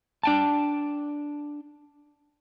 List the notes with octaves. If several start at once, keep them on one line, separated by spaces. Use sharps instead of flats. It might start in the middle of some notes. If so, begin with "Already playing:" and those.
D4 G5 A5